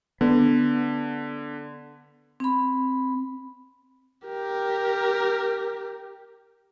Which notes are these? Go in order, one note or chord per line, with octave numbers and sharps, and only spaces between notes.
D3 B3
C4 B5
G4 A#4